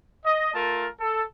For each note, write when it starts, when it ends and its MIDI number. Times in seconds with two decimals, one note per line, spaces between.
0.25 0.52 75
0.54 0.86 57
0.54 0.86 65
0.54 0.86 70
0.54 0.86 81
1.00 1.24 69